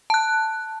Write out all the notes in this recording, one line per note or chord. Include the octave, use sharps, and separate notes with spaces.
A5 F#6